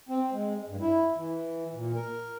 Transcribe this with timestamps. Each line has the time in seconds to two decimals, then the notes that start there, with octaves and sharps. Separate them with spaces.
0.09 C4
0.31 G#3
0.68 G2
0.80 E4
1.16 E3
1.73 A#2
1.95 A#4